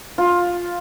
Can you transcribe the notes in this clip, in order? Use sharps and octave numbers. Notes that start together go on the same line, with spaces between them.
F4